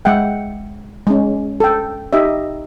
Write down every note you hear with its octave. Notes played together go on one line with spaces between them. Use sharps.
G#3 E5 F#5 G5
G#3 C#4
A4 G5
D#4 G4 D#5 E5